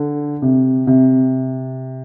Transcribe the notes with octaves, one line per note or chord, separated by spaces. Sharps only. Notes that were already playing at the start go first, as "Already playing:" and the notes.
Already playing: D3
C3
C3